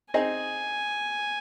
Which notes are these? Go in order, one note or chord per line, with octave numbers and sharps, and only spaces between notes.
C4 D#4 G#4 D#5 G#5